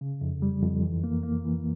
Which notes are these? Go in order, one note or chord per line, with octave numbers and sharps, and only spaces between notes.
C#3
F2
G3
F2
E3
A#3
A#3
E3